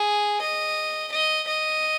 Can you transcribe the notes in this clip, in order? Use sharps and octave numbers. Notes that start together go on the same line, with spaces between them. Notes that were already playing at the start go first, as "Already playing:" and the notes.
Already playing: G#4
D#5
D#5
D#5